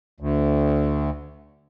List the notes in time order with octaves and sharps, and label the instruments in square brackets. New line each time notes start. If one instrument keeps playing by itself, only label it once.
[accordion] D2